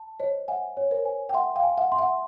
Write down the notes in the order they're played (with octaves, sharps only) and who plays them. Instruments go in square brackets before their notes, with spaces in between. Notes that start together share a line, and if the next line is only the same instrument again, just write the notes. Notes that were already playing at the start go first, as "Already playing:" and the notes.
Already playing: [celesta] A5
[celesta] C5 [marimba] C#5 D#5
[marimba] E5 F#5 [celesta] G#5
[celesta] C#5
[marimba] A#4 C5
[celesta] G#5
[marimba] G5
[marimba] E5 F#5 [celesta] C6
[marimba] F5 G5
[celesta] G#5
[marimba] E5 F#5
[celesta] C6
[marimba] E5 F#5